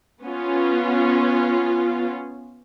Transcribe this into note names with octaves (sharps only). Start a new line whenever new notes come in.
B3 C#4 F4